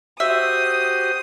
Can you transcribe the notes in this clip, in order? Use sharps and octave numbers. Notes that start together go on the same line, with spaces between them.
F#4 G4 C5 E5 D#6